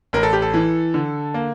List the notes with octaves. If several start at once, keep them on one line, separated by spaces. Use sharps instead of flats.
A1 A#4
A4
G4
A4
E3
D3
A#3